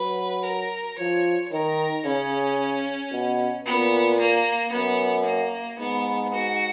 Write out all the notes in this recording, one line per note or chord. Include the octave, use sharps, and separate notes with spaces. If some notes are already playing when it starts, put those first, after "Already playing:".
Already playing: F#3 B4
A#4
F3 C#5
D#3 A#4
C#3 C#4
B2
A#2 B3
A#3
F#2 B3
A#3
G#2 B3
F#4